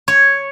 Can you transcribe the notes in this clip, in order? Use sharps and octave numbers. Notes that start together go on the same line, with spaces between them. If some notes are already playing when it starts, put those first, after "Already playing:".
C#5